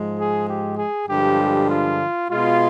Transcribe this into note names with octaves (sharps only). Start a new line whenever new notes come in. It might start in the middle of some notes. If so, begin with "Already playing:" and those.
Already playing: G#2 F3 G#3
G#4
G4
G#4
G2 D3 F3 G#3 G4
F4
B2 G#3 F4